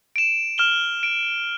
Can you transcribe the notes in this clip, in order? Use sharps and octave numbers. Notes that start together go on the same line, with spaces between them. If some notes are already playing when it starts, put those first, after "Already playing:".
D7 E7
F6 E7 G7
D7